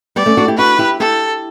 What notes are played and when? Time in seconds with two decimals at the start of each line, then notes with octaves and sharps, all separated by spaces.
0.16 G3 B3 D5
0.26 A3 C#4
0.37 D4 F#4
0.48 E4 G4
0.57 D4 F#4 B4
0.79 E4 G4
1.00 E4 G4 A4